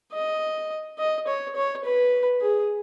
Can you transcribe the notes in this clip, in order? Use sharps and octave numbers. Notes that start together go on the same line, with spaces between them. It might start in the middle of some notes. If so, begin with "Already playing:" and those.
D#5
D#5
C#5
C#5
B4
G#4